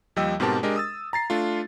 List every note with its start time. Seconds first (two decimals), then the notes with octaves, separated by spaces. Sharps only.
0.16 D#2 F3 G3 D#5 G5 E6
0.40 G#2 B2 C4 G4 A#4 A5
0.63 G#3 D4 G4 A#4 D#5
0.76 D#6 E6 A6
1.13 A#5 A6 C7
1.30 A3 D4 F4